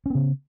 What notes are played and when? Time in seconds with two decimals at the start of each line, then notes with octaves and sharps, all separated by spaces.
0.06 C#4
0.10 B3
0.15 C#3